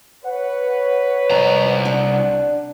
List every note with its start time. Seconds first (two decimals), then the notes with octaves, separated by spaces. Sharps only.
0.24 B4 C#5 F#5
1.31 C2 F2 A#5
1.85 D4